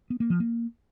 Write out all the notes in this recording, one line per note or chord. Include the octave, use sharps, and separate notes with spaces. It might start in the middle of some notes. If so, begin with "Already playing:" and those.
B3
A#3
F3
A#3